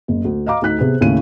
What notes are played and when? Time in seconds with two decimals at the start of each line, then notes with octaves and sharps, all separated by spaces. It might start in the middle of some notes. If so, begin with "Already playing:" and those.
0.08 F#1
0.24 D2
0.46 D#5 F5 A#5 D6
0.62 D2 D#4 F#6 B6
0.78 C3 B3 G#4
1.01 D#2 A2 C#3 C#4 E4 D#7